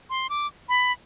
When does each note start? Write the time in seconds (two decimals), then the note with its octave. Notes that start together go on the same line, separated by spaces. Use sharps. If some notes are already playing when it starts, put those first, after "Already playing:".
0.10 C6
0.30 D6
0.69 B5